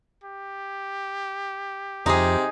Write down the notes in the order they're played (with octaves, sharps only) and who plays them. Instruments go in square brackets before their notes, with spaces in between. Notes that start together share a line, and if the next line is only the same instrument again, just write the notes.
[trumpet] G4
[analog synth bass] F2 [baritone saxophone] C3 [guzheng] D#4 G#4